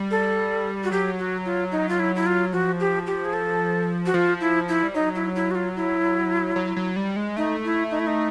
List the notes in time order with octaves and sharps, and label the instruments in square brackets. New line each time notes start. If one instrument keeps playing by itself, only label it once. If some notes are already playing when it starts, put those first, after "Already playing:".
Already playing: [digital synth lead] G3
[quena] A4
F#4
[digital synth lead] F#3 [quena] G4
[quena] F#4
F4
D#4
F4
E4
E4
F4
[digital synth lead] F3 [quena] F#4
[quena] G4
G4
G#4
A4
F#4
[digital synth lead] F3 [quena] F4
[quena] E4
E4
[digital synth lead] G3
[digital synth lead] F#3 [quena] D#4
[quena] E4
E4
F#4
F4
E4
[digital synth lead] F#3
F#3
G3
G#3
[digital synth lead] A3 [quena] D#4
[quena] E4
D#4
E4
D#4